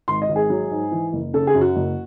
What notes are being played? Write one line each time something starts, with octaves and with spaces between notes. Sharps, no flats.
G#1 C6
D#5
G#1
G#4
F#3
G#2
E3
F#1
C#3 A4
G#4
F#2
F#4
F#1